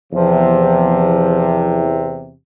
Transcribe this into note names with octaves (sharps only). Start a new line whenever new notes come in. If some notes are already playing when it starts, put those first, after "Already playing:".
E2 C3 F3